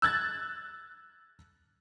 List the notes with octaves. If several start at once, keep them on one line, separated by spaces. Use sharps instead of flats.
E6 F#6 G#6 A6